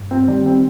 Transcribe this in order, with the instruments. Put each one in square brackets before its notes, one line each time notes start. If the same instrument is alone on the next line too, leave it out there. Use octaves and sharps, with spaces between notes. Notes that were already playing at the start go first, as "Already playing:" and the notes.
Already playing: [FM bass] G2
[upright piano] C4
[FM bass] D#3 [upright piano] G3
[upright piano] C4